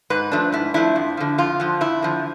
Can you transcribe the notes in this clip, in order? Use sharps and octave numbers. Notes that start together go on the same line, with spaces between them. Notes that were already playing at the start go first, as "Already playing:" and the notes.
G#2 B4
F3 A3 D4
G#2 E4
F3 A3 D4 E4
F2
D3 F3
F2 F4
D3 F3
F2 E4
D3 F3